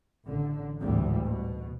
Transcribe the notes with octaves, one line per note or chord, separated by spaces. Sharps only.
A1 D3
G#1 D2 A2 E3 G3
B2